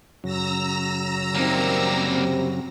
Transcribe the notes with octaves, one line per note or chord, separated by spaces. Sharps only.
F#2 C#3 F#3 A#5 E6 A#6
D#3 G3 A#3 C4
C3 C4